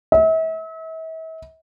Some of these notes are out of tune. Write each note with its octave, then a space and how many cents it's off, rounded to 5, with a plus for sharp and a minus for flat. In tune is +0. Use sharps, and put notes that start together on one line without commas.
E5 -40